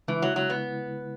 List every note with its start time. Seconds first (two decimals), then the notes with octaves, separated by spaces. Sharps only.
0.08 C#3 E3 G#3 E4
0.22 F#3
0.36 F#3
0.50 B3